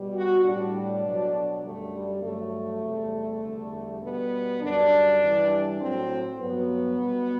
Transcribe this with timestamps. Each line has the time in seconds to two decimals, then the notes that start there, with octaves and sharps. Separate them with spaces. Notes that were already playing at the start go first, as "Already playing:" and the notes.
Already playing: B2 G3
0.15 F#4
0.44 A2 G3 D4
1.04 B2 F#3
1.63 F#2 D3 G3 A3
1.94 G3
2.23 G2 F#3 A3
2.83 E2 C3 G3
3.42 E2 D3 G3
4.01 B2 G3 B3
4.61 F#2 D3 G3 D4
5.21 G2 E3 G3
5.80 A2 F#3 C4
6.39 G2 F#3 B3
6.98 B2 G3